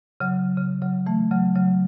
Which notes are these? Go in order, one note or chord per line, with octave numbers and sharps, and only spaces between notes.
C#3 F#3
C#3
C#3 F#3
E3 A3
C#3 F#3
C#3 F#3